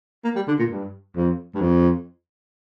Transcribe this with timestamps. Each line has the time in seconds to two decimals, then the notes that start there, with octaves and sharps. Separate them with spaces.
0.24 A#3
0.35 G3
0.48 D3
0.59 A#2
0.70 G2
1.16 F2
1.54 G2
1.61 F2